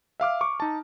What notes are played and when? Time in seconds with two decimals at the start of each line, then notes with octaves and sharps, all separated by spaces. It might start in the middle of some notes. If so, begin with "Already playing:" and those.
0.20 E5 F5 D6 F6
0.41 C#6 D6
0.60 D#4 A5